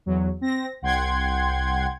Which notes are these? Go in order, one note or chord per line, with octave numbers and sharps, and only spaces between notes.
E2 F#3
C4 A#6
C2 F#5 G5 C6 G#6